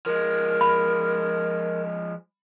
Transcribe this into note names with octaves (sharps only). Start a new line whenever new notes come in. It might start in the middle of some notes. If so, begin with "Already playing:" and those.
F3 G#3 A#4
B5